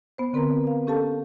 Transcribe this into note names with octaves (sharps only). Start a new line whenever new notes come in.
B3 C5
D3 C4 A#4 B4 A#5
F5
C#4 G4 A4 F5 A5